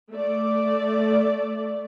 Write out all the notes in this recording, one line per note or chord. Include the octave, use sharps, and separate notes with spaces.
A3 D5